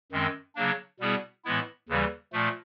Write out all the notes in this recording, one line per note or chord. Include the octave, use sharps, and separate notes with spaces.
F#2 D#3 G#3 C4
C#3 F#3 A#3 D4
B2 G3 B3 E4 G#4
A2 E3 G#3 B3 E4
D#2 C#3 E3 G3
A#2 F3 A3